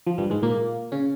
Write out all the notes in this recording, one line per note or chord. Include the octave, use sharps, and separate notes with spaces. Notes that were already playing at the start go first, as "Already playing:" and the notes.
F3
G2 G3
G#2 G#3
A#2 A#3
C#3 C#4